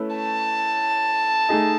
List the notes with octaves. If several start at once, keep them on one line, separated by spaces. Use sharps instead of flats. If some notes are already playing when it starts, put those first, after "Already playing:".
Already playing: A3 C#4 E4 B4
A5
A3 D#4 G#4 D#5